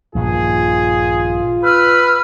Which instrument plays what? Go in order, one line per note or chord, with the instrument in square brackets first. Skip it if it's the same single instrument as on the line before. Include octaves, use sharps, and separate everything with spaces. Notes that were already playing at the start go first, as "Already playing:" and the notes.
[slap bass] A#1 G2 D#3 [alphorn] F4 [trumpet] G#4
[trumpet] B4 [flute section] B5 E6 F6